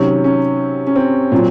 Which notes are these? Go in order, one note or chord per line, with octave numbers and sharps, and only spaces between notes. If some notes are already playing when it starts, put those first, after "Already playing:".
Already playing: C3 D#3 F#3 C#4
C#4
C#4
C4
A#2 F#3